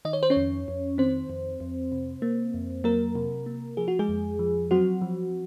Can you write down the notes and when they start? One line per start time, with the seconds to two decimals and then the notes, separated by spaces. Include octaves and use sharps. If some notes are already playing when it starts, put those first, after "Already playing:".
0.05 D#3 D#5
0.13 C#5
0.23 C5
0.30 C#4 C#5
0.37 F2
0.68 F2
0.98 D#3 C4 C5
1.30 F2
1.60 F2
1.92 C3
2.22 A#3
2.54 F2
2.84 F#3 A#3 A#4
3.15 C3
3.46 A#3
3.77 F3 G#4
3.88 F#4
3.99 G#3 G#4
4.09 F2
4.39 F3
4.71 F#3 C4 F#4
5.02 F3